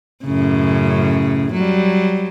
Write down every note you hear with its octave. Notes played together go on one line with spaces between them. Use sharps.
F#2 A2 C#3
F#3 G3